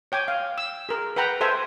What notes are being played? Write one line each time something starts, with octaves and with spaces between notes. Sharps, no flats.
C#5 G5 G#5 D6
F5
E6
G#4 A#4
B4 F#5 G5 A#5 B5
A4 C5 E5 G5 G#5